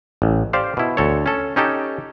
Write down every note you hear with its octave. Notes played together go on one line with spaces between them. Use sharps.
A1
G4 C5 D5 F5
B2 E4
D2 A4 C#5
C#4 A4
C#4 D#4 G4 A4